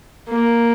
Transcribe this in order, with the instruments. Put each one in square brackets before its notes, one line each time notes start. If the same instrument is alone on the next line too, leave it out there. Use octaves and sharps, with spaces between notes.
[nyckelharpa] A#3